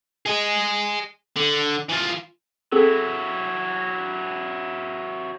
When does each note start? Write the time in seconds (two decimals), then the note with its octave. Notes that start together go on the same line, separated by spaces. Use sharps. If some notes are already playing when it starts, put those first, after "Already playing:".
0.26 G#4 D#5
1.36 D3
1.89 E3 F4
2.72 F#3 C4 E4 G#4 A4